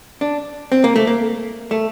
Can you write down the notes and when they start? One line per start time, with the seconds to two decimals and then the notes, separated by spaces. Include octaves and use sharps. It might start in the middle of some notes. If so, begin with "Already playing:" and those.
0.21 D4
0.72 C4
0.84 A#3
0.96 A3
1.07 A#3
1.71 A3